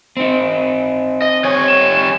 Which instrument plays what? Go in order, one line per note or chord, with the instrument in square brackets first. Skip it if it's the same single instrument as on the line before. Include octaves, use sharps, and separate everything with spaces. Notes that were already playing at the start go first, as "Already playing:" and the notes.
[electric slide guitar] C4 D#4
[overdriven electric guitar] D#5
[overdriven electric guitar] G3 G#5 [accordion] C#5
[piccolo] E7